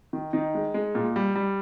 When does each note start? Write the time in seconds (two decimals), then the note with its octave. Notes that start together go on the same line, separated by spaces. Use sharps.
0.13 D#3
0.33 D#3 D#4
0.55 G#3
0.74 G#3
0.95 A#2
1.16 G3
1.35 G3